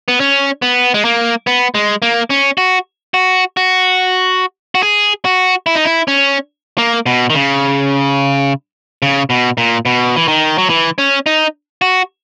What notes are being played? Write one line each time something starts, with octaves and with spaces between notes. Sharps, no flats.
B3
C#4
B3
G#3
A#3
B3
G#3
A#3
C#4
F#4
F#4
F#4
F#4
G#4
F#4
E4
D#4
E4
C#4
A#3
B2
D#3
C#3
C#3
B2
A#2
B2
E3
D#3
F#3
E3
C#4
D#4
F#4